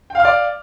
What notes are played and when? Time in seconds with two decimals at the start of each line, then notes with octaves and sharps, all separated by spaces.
0.10 G5
0.15 F5
0.20 F6
0.25 D5